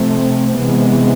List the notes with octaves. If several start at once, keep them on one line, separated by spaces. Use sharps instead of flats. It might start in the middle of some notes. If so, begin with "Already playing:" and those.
Already playing: C3 F3 A3 C4
C3 E3 G#3 B3